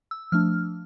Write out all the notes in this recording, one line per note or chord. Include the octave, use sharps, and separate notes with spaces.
E6
F3 A3 D4 F6